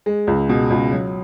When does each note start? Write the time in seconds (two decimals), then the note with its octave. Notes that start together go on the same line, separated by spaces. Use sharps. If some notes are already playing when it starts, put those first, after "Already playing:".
0.06 G#3
0.27 C#2
0.49 B2
0.70 C#2
0.92 F#3